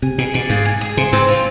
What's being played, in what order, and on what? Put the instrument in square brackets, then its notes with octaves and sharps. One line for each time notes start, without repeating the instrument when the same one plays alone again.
[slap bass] C3 [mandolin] G#5
[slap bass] B2 [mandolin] G#4
[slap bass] B2 [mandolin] D5
[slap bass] G#2 [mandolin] F5
[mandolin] G#5
G#4
[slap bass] C3 [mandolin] C5
[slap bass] G#2 [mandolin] C4
[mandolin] F4